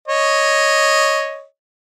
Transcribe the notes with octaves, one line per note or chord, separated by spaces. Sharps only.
C#5 D#5